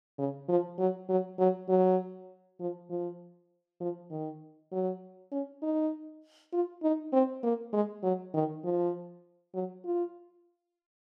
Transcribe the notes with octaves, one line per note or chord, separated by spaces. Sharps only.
C#3
F3
F#3
F#3
F#3
F#3
F3
F3
F3
D#3
F#3
C#4
D#4
F4
D#4
C4
A#3
G#3
F#3
D#3
F3
F#3
F4